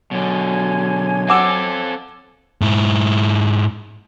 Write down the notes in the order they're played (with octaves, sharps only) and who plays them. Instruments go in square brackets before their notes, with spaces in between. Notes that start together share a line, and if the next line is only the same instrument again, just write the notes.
[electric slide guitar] B2 D3 [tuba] F#3 [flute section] C#5 G#5 G#6
[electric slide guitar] C4 A4 [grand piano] F#5 D6 E6
[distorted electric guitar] G#2 E4